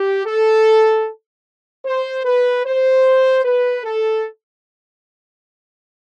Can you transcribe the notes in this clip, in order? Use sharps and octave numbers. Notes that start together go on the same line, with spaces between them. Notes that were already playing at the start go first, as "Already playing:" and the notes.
Already playing: G4
A4
C5
B4
C5
B4
A4